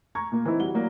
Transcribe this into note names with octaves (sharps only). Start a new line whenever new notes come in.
A#5 C#6 G#6
A#2 A#3
E3 C4 D#4 E4
G3 F#4 G7
F#3 A#3 D5